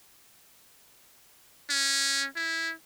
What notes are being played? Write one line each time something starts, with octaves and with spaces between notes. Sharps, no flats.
C#4
E4